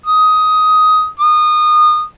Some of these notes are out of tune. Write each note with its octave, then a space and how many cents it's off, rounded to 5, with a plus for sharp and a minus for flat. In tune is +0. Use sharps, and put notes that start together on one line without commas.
D#6 +10
D#6 -25